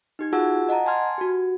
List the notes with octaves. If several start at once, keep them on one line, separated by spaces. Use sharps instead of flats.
D#4 G4 G#6
F4 F#4 G#4 F#5 A5 E6
D#5 F#5 A5 A#5
G#5 A5 C6 F6 G#6
F#4 G4